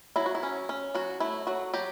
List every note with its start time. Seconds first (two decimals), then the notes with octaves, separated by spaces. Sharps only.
0.16 F#3 E4
0.26 F#4
0.35 E4
0.43 C#4
0.69 C#4
0.95 F#3 F#4
1.20 A3 E4
1.47 F#3 F#4
1.74 F#3 G4